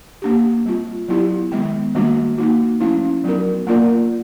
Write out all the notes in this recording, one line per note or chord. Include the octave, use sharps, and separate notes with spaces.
A#3 D4 G4
G3 C4 F4
F#3 B3 E4 G4
D#3 G#3 B3
D#3 G3 A#3 D4 F#4
A#3 D#4 F#4
F3 A3 C#4 E4
F#3 B3 D#4 F#4 A#4
A#3 D4 F4 A#4 D5